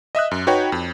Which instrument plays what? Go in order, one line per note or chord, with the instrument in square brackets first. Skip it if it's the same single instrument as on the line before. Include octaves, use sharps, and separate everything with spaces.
[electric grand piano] D#5 E5 D#6 F#6
F#2
D#4 F#4 B4 C#5 G5
F2